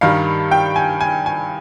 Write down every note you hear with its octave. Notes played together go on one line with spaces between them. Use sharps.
G2 D#3 G3 F5
G5
G#5
G#5
G#5